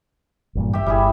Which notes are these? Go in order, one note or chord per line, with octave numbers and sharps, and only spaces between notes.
A1 G2 A#2
G4 E5
G1 G3 E4 G#4